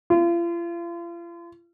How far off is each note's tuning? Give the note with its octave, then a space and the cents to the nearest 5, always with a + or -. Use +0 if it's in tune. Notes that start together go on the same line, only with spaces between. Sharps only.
F4 -40